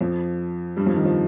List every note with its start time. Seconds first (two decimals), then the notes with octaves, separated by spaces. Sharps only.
0.01 F2 F3
0.76 G2 G3
0.86 F2 F3
0.96 D#3
1.05 F3